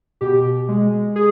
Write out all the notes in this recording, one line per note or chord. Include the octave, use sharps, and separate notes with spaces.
B2 G4
G#3
G#4